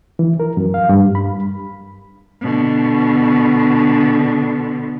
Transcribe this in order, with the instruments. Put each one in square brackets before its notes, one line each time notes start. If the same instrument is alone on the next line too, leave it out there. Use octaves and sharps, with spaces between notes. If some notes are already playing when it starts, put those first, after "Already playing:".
[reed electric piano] E3
A#4
F#2
F5
G2
B5
[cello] B2 D3